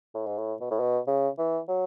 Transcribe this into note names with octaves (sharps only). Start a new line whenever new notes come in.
A2
G#2
A2
B2
A2
B2
C#3
E3
F#3